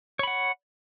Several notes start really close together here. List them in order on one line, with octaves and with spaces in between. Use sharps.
C#5 B5 F#5